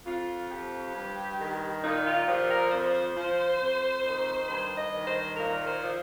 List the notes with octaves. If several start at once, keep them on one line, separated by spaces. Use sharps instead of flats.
F2 F4
F3 G4
G2
D#3
A#2 D#4
F4
F3 G4
A#4
F2 C5
F3
F2
D#3
G2 C5
D#5
D#3
C5
A#2 A#4
C5
F3